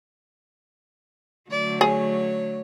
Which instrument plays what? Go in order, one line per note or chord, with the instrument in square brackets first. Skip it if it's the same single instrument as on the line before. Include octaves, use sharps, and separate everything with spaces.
[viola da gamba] D3 F#3 A3 [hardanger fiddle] D5
[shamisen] G#4 [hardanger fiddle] C#5